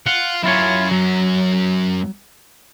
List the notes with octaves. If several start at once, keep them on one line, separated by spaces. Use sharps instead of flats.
F4 F#5
F#2 C#4 E4 F4 C#5
F#3